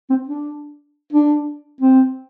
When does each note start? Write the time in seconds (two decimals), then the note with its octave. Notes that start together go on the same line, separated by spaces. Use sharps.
0.10 C4
0.27 D4
1.13 D4
1.81 C4